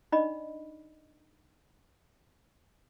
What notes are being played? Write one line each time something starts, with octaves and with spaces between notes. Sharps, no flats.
D4 D#4 D5 D#5 B5